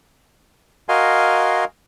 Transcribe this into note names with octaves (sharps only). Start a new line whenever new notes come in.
F#4 A#4 D#5 F5 G#5 C6